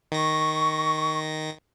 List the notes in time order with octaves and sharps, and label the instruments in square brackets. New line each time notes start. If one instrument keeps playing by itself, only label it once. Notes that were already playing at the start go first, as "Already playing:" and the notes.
[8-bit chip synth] D#3 A#6 [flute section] C#6